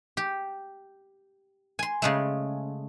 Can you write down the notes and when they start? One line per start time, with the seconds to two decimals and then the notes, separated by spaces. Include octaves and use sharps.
0.17 G4
1.79 G#5 C6
2.02 C#3 G#3 A3